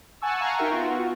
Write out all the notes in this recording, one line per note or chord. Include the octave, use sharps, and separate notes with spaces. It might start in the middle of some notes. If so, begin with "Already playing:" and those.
F#5 G#5 A5 C#6 E6
F5 F#5 G#5 A#5 C#6
D#4 F#4 A#4 E5 G5
B3 F4 F#4